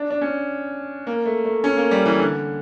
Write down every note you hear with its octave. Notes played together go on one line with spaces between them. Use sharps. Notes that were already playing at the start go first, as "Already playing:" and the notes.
Already playing: D4
D4
C#4
A#3
A3
A3
C#4
A#3
G3
E3
D3